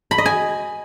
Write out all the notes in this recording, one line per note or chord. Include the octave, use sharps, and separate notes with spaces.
B5
D#5
G#5